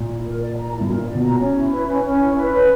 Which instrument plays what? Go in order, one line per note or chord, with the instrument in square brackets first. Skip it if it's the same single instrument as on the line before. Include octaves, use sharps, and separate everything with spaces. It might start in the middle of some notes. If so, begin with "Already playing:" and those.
Already playing: [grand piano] A#2
[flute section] E4
A#4
D5
A#5
E4
[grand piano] G2
[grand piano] A#2 [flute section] A#4
[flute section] D5
[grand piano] B2
[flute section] A#5
C#4
E4
B4
C#4
C#4
E4
B4
C#4